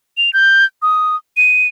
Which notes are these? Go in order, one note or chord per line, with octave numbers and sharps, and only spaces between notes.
F7
G6
D#6
D#7